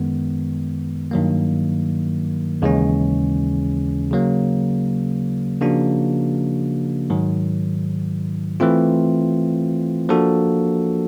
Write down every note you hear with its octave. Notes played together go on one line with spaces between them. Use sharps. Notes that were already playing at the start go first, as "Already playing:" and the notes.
Already playing: F#2 D#3 G#3 B3
G2 D#3 F#3 A#3
D#2 C#3 E3 G#3 C#4
C#3 F#3 A#3
C#3 F3 A#3 D4 F#4
G#2 D#3 F#3
E3 A3 C4 F4
F3 A#3 D4 F#4 A4